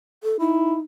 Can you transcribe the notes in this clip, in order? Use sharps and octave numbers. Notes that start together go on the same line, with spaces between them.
A4
D#4 E4